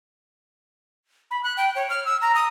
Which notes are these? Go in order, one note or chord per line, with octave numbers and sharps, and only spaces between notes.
B5
F#6
G5
C#5
F6
E6
A#5
D#6